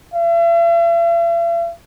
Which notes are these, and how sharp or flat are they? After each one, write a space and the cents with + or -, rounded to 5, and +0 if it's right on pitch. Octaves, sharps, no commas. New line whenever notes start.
E5 +45